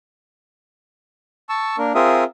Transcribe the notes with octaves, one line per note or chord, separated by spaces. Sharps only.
A5 C#6 E6
A#3 D4 A#4
C4 F4 G#4 A#4 E5 D#6